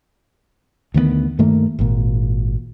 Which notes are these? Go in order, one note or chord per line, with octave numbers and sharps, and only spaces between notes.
D2 D#3 A3 B3
G2 D#3 A3 A#3
G#1 A#2